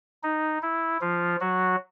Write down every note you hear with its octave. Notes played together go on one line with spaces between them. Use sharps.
D#4
E4
F3 F4
F#3 F#4